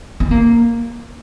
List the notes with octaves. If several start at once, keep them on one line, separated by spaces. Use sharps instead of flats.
C4
A#3